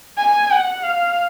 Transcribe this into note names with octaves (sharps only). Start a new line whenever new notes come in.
G#5
F#5
F5